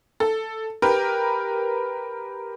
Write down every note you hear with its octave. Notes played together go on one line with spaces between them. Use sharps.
A4
G4 A#4 B4